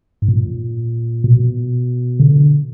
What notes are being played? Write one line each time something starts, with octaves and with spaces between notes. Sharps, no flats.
G#2
A#2
B2
D3